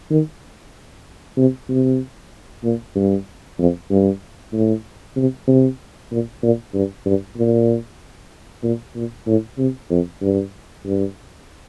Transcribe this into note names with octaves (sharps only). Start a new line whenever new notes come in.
D#3
C3
C3
A#2
G2
F2
G2
A2
C3
C3
A#2
A#2
G2
G2
A#2
A#2
A#2
A2
C3
F2
G2
G2